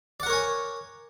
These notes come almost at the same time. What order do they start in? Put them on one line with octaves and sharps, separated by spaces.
D5 F#5 A#4 C#5 G#5